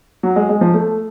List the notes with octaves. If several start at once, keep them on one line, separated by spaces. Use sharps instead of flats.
F#3
G#3
G#3
F3
A3